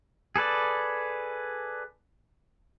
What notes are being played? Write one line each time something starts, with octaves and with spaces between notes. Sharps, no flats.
G#4 A4 B4 D5